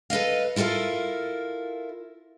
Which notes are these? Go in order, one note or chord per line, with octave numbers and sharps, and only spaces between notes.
A4 B4 D#5 F5
E4 F4 A4 A#4 F5